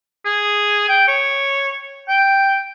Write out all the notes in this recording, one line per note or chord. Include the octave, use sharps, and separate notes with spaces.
G#4
G5
C#5
G5